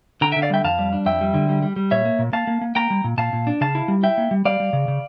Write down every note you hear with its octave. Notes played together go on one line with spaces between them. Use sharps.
D3 G5 A#5
E5 G5
D3
D5 F5
G3 E5 G5
F2 F5 A5
G3
D4
F2 E5 G5
G3
D3
G3
G3
G3
A#2 C#5 E5
A#3
A#2
A#3 F5 A5
A#3
A#3
A#3 G5 A#5
G3
A#2
A#2 F5 A5
A#2
D4
C#3 F5 A5
E4
G3
E4 E5 G5
A#3
G3
G3 D5 F5
G3
C#3
C#3